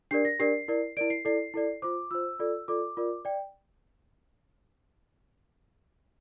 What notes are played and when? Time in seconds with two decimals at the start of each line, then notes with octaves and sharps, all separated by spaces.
0.11 D4 G4 A#4 D5 C7
0.25 A#6
0.39 D4 G4 A#4 D5 C7
0.68 E4 A#4 D5
0.97 E4 A#4 D5 D7
1.10 C7
1.25 E4 A4 D5 C7
1.54 E4 A4 D5
1.82 F4 C5 D6
2.11 F4 C5 E6
2.40 F4 A4 D5
2.68 F4 A4 D5 D6
2.97 F4 A#4 D5
3.25 D5 G5